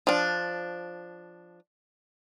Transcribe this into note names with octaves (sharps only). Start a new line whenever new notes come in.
F3 D4